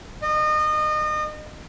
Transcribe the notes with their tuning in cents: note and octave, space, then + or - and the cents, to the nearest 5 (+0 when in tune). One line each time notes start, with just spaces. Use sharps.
D#5 -30